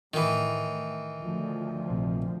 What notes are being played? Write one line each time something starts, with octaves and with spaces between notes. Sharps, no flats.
A2 D#3 E3
D2 F3
A#1 C3